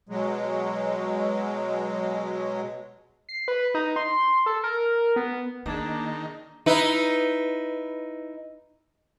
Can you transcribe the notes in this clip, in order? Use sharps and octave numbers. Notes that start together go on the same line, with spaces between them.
B2 F#3 G#3
C7
B4
D#4
C6
A4
A#4
B3
D#3 A#3 D4 G#4 A#5
D#4 E4 B4